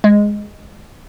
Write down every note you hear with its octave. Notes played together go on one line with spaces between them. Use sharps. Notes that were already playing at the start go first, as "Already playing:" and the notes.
G#3